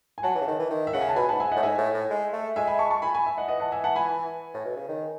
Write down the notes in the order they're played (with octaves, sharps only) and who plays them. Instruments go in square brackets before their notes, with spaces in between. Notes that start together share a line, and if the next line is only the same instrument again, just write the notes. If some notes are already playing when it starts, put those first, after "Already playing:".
[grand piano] G#5
[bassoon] F#3 [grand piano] F#5 A5
[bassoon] E3
C#3
D#3
E3
D#3
[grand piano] E5
[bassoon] C#3 [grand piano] F#5
[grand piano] G#5
A5
[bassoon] B2 [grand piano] G#5 B5
[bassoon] G#2 [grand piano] F#5 A5
[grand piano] E5 G#5
[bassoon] A2 [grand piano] D#5 F#5
[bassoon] G#2 [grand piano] E5 G#5
[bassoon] A2
A2
G#3
A3
[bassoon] G#3 [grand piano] E5 G#5
[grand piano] G#5 B5
A5 C#6
A5 C#6
G#5 B5
G#5 B5
E5
D#5 F#5
[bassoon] E3 [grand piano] D#5 F#5
[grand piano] F#5 A5
E5 G#5
F#5 A5
G#5 B5
[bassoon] A2
B2
C#3
D#3